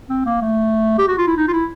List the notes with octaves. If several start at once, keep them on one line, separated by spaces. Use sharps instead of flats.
C4
A#3
A3
G4
F#4
F4
E4
D#4
F4
E4